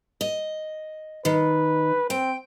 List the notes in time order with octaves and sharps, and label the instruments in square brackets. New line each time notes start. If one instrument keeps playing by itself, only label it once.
[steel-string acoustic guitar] D#5
[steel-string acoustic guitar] D#3 [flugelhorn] B4
[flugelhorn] C4 [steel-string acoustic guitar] G5